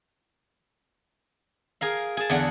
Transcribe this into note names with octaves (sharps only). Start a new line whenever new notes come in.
G#4 A#4 F5
G#4 A5
E2 D3 F#5